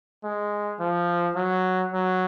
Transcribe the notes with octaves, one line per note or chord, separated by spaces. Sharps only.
G#3
F3
F#3
F#3